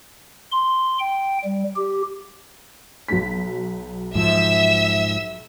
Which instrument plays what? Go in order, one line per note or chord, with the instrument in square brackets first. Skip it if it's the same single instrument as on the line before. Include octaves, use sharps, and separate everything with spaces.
[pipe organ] C6
G5
G3
G4
[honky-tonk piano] B1 F#3 B6
[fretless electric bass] G#2 F3 [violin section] E5 E6